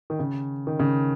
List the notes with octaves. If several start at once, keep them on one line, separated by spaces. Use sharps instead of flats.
D#3
C#3
D#3
C#3